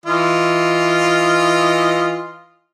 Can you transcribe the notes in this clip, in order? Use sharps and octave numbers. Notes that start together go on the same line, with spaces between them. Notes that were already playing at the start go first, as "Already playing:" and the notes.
E3 F4 D#5